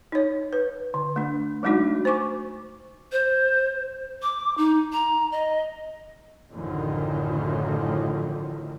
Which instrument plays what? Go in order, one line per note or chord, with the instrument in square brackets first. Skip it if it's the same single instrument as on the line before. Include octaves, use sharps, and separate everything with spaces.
[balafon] D#4 C#5
B4
D3
A3 D4
F#3 G#3 A3 D4 D#4 F#4
C5 G#5 C#6 D6
[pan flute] C5
D6
D#4
A#5
D#5
[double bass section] A1 F#2 D3 D#3 F3